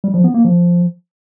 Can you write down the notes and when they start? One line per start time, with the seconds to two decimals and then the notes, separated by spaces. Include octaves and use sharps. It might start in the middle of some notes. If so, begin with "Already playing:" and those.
0.04 G3
0.14 F3
0.24 B3
0.34 A#3
0.44 F3